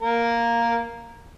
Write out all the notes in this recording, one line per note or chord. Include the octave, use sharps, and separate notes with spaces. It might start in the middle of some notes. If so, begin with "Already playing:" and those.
A#3 A#4